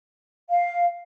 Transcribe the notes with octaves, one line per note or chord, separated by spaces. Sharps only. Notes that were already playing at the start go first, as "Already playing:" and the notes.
F5